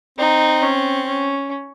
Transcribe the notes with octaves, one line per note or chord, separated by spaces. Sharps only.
C4 D#4
C#4
C#4